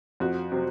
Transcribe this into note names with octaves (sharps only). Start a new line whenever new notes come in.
F2 F#4
C3 F#3